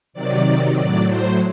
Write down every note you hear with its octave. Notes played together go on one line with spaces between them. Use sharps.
C3 D#3 F#3 D5
A2 F#3 D5
C5